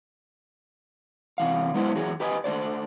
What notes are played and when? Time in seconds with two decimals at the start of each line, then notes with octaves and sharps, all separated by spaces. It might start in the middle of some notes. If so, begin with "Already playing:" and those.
1.38 C3 E3 F5
1.74 F#2 G#3 B3 D4 E4 C5
1.95 E2 F#3 G#4
2.20 G4 B4 D#5 G5 G#5
2.44 A3 D4 C5 D5